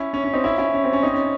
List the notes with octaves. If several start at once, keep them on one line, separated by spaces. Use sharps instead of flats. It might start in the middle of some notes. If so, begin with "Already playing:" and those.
Already playing: C#4 E4
C#4
C#4
C4 D#4
C#4 E4
C#4 E4
C#4
C4
C#4
C4 D#4
C#4